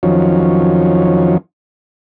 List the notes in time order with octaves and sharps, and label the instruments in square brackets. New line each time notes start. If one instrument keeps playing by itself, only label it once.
[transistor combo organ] F2 D#3 F3 F#3 C#4